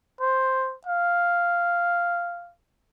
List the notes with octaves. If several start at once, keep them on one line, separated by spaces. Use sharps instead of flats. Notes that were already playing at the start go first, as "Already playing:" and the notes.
C5
F5